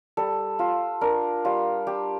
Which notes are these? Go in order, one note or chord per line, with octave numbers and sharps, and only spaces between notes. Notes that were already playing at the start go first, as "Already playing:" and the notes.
G3 A4
F4
D4 A#4
G3 F4
D4 G4